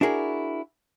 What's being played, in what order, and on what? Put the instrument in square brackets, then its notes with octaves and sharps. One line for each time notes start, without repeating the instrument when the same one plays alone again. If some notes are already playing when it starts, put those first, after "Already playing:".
[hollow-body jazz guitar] D4 E4 F#4 G#4 A#4